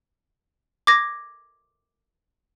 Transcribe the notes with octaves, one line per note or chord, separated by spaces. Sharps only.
D6 G#6 A#6